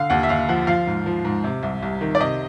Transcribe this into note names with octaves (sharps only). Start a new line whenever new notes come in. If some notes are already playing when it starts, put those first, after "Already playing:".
Already playing: D3 F5
D#2 F#5
E5
D#2 F5
F3 F#5
F3 F5
G#2
F3
G#2
C3
C2
C2
D#3
D5
C3 D#5